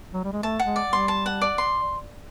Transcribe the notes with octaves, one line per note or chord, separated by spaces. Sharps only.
F#3
G3
G#3
A3 A5
F#5
G#3
D5
G3
C6
A5
F#5
D5
C6